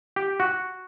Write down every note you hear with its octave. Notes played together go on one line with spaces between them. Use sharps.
G4
F#4